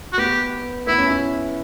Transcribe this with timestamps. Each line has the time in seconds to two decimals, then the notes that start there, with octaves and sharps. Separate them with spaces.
0.13 F#4
0.18 B3 G4
0.87 B3 E4
0.98 C#4
1.10 E4